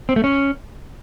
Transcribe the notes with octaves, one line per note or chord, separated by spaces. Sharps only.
C4
A3
C#4